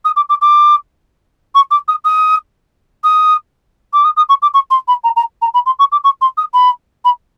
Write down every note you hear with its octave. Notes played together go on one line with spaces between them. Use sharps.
D#6
D6
D6
D6
C#6
D6
D#6
D#6
D#6
D6
D#6
D#6
C#6
D6
C#6
C6
B5
A#5
A#5
A#5
B5
C6
C#6
D6
C#6
C6
D#6
B5
B5